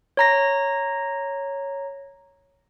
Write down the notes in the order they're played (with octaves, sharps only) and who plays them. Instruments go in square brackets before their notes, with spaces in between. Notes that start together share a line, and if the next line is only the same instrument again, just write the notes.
[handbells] C#5 A#5 A#6